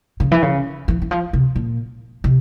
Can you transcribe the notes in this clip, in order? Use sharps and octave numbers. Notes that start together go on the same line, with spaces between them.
C#3
E3
C#3
E3
E3
F3
C3
A#2
C3